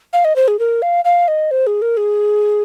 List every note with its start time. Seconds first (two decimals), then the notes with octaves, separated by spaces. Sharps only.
0.13 F5
0.25 D#5
0.36 C5
0.48 G#4
0.59 A#4
0.82 F5
1.05 F5
1.28 D#5
1.51 C5
1.67 G#4
1.82 A#4
1.97 G#4